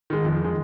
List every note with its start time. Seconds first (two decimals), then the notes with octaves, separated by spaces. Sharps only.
0.10 D#3 G#3
0.25 F2
0.41 D#3 G#3